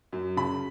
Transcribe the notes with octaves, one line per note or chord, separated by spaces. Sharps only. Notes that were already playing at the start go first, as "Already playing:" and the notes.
F#2
C#3 B5